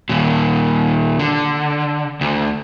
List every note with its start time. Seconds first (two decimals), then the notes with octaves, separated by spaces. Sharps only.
0.09 D#2 A#2
1.19 D3
2.21 D2